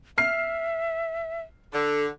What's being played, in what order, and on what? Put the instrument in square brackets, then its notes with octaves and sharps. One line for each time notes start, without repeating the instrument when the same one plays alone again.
[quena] E5 [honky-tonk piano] F6 C7
[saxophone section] D3 [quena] A4